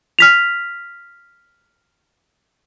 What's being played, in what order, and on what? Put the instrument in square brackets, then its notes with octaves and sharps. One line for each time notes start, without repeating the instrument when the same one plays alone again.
[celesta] F6 B6 F7